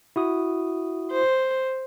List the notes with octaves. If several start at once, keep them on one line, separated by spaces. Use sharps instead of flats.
E4 F#4 D#6
C5